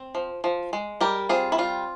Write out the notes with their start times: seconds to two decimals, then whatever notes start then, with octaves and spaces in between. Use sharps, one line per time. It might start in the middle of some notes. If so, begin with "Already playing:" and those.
Already playing: C4
0.15 F3
0.44 F3
0.73 G#3
1.01 G3 G4 A#4
1.29 C4 F4 G#4
1.52 E4
1.58 G3 F4